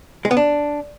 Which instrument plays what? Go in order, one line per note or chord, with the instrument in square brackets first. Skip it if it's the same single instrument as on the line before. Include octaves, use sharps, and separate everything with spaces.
[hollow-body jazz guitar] G#3
B3
D4